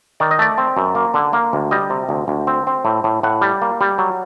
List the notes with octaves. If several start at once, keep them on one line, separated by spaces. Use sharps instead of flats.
D#3 D5
D#5
A3 D5
C4
F#2
A#3
D3
A#3
D2
G3 D#5
C3
D2
D2
C4
C4
A2
A2
A2 F#5
G3
A#3
G3
F#3